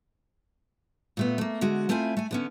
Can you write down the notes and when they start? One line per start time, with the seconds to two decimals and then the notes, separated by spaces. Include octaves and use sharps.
1.17 A#2 A3 B3
1.38 A3 A#3
1.61 D3 G#3 F#4
1.89 A3 C4 E4 F4 G#5
2.17 A3 G#5
2.31 D3 B3 C#4